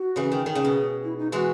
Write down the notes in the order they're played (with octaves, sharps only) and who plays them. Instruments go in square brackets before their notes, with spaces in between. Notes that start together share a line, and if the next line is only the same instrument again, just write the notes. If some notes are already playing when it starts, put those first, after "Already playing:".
Already playing: [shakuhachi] F#4
[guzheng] C#3 E3
D#3
[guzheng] D#3 [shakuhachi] G#4
[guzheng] C#3
B2
[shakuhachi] E4
D#4
[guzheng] E3 G#3 [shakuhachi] F#4